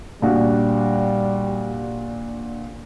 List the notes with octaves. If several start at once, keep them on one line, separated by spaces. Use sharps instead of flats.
A#2 G3 D4 F#4